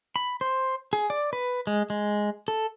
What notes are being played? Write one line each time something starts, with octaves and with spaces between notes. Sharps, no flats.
B5
C5
G#4
D5
B4
G#3
G#3
A4